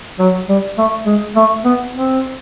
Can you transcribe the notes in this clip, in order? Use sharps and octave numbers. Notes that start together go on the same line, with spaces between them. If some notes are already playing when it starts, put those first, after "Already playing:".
F#3
G3
A3
G#3
A3
B3
C4